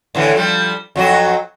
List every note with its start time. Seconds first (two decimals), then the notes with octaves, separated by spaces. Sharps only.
0.15 A2 D3 E3
0.36 F3 G3
0.96 F2 F#3 F#4